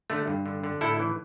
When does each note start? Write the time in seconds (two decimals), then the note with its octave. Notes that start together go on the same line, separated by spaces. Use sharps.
0.10 D3 A3
0.27 G2
0.46 D3
0.63 D3
0.81 A2 E4 A4
0.99 E3